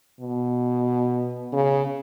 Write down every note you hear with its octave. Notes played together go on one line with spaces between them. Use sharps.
B2
C#3